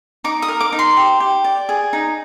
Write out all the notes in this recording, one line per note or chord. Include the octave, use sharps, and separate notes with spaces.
D#4 D6
D#6
A#4
D6
D#4
C6
G4
G4
D5
G#4
D#4